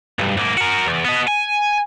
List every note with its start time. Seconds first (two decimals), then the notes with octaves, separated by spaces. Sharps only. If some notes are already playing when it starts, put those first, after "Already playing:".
0.19 B1 G2
0.37 G#2 A#3
0.57 F#4 A#4
0.86 E2
1.05 B3 D#5
1.28 G#5